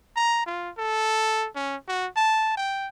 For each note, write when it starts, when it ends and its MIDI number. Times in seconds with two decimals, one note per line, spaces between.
0.16 0.44 82
0.46 0.70 65
0.78 1.47 69
1.55 1.76 61
1.88 2.07 66
2.17 2.52 81
2.57 2.88 79